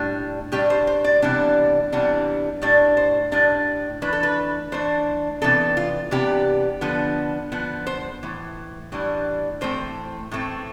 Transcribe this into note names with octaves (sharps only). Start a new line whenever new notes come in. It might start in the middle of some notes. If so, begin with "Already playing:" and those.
Already playing: A2 G3 D4
A2 G3 D4 G4
C5
C5
D5
C3 E3 G3 B3 D4
C3 E3 G3 B3 D4
A2 G3 D4 D5
C5
A2 G3 D4 D5
E3 A3 D4 B4
A4
B4
E3 A3 D4 C5
C3 E3 B3 D4 A4
F4
C3 E3 B3 D4 G4
D3 F3 B3
D3 F3 B3
C5
A2 E3
A2 E3 G3 D4
A2 E3 A3 C4 C5
A2 E3 A3 C4